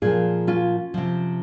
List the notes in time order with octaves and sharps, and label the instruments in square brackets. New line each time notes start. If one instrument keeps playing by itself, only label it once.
[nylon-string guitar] A#2 F3 F4 G#4
C#4 F4
C3 F3